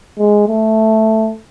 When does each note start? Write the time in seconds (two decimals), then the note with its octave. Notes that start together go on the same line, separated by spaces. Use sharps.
0.18 G#3
0.48 A3